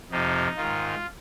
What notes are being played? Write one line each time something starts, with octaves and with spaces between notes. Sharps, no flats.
F2 C3 F3 D#4
G#2 D#3 F4